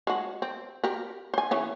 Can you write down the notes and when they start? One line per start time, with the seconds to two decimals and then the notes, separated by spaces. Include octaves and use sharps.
0.07 G#3 F#4
0.42 C4
0.84 G4 A#4
1.34 C5 G#5
1.51 E3 C#4 G#4